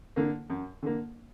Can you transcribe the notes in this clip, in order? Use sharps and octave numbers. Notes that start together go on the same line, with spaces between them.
D3 A#3
F#2
D3 A#3